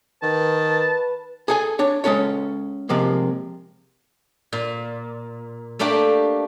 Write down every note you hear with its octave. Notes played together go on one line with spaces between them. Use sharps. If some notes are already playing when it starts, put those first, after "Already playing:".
D#3 B4 A5
B4
G#4 A4 G#5
D4 C#5
G#3 C#4 A4 C#5
C3 F3 G#3 A#3
A#2
A3 A#3 D4 G4 G5